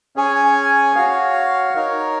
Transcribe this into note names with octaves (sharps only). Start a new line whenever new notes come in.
C#4 G#4 C#5 G#5
F#4 C#5 F5
D#4 A#4 C#5